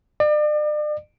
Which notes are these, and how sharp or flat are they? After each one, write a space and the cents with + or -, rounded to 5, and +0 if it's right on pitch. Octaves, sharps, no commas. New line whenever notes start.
D5 +40